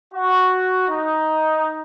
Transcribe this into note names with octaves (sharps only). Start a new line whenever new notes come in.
F#4
D#4